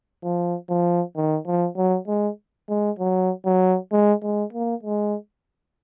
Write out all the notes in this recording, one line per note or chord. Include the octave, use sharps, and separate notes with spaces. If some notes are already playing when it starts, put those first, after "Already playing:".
F3
F3
D#3
F3
F#3
G#3
G#3
F#3
F#3
G#3
G#3
A#3
G#3